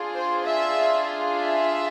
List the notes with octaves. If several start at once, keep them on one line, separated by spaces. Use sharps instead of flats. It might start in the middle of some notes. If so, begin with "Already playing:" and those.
Already playing: D4 F4 G#4
C5
E5
E5